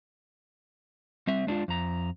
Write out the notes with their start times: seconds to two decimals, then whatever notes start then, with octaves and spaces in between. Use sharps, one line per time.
1.27 G3 C4 E5
1.47 G#3 D4 D#4 F4
1.68 F2 A#5